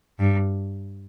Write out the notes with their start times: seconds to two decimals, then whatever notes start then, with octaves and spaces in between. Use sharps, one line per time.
0.19 G2